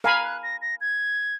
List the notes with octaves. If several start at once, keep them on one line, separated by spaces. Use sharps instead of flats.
A#4 F5 G#5 B5
F#6
A#6
A#6
G#6